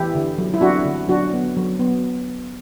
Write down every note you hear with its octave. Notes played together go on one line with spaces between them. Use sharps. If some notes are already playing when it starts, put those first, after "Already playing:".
Already playing: E3 E4 G4
D3
F#3
E4
C4 D4 F#4
D3
F#3 D4 F#4
B3
F#3
B3